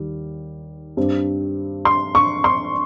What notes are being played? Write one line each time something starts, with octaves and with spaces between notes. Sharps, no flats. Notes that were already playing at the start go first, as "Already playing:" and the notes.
Already playing: D#2 D#3 G3
G2 G3 C4
C6
C#6
C6